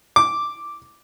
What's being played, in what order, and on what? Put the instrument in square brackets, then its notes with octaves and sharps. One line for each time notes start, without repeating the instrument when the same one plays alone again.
[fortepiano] D6